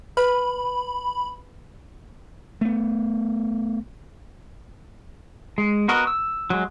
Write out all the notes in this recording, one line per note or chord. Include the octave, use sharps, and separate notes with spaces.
B4 B5
A3 B3
G#3
B3 F#4 A#4 D#5
E6
F#3 G#3